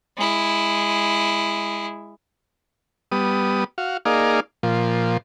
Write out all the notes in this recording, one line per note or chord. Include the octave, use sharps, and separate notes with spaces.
G#3 E4
G3 B3 D#6
F#4 F5
A#3 D#4 G#4 D5 F5
A#2 F3